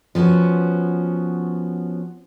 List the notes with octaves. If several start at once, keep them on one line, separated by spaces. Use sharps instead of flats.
F3 B3 C#4 F#4